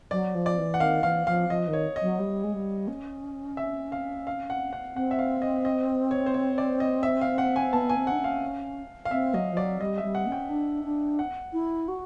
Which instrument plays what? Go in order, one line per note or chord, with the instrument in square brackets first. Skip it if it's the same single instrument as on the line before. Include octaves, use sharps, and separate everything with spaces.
[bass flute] F#3 [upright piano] D5
[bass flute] F3
[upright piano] D5
[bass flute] E3
[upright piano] F#5
[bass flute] D#3 [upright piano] F5
[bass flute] E3 [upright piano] F5
[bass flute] F3 [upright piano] F5
[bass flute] F3 [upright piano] D#5
[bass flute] D#3
[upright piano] C#5
D#5
[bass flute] F#3
G3
G#3
G3
C#4
[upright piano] E5
F5
F5
F#5
F#5
[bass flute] C4 [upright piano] F#5
[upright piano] E5
F5
D#5
D#5
C#5
C5
C#5
D5
D#5
E5
F5
F#5
G#5
[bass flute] B3 [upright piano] A5
[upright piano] G#5
[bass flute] C4
[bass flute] D4 [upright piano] F#5
[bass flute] C#4
[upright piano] F5
F5
[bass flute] C4 [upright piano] E5
[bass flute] F#3 [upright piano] D#5
[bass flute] F3
[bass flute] F#3 [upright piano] D5
[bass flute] G3 [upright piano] D#5
[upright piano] E5
[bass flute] G3
[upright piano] F#5
[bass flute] C#4
[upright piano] G5
[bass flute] D4
D4
[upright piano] F#5
[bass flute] E4
F#4